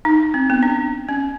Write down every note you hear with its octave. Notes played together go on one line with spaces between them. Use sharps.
D#4
C4
B3
D4
C#4